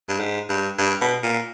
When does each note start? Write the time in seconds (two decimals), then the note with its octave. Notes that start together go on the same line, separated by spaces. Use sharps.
0.09 G2
0.19 G#2
0.49 G2
0.78 G2
1.01 B2
1.23 A#2